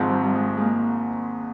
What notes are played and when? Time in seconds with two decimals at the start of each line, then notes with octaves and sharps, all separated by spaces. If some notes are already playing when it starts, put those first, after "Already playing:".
Already playing: G#1 G#2 F3 C4
0.09 G3
0.24 G3
0.35 G#3
0.57 G#3 A#3